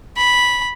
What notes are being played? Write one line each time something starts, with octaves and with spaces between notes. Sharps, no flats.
B5